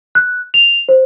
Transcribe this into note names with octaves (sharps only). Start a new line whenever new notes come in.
F#6
F7
C5